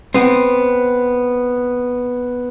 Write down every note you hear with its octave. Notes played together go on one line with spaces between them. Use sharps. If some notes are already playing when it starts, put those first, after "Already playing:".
B3 C4